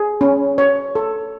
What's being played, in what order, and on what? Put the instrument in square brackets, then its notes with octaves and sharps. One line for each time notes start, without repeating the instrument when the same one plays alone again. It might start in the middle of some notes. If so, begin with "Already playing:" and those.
Already playing: [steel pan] G#4
C#4
C#5
A4